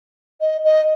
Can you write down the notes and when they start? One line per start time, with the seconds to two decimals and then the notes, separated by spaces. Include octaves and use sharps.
0.41 D#5
0.64 D#5